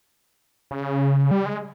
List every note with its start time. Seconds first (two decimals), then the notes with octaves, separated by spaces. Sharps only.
0.71 C#3
1.31 G3
1.46 G#3